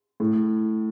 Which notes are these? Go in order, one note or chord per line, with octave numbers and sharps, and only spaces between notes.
A2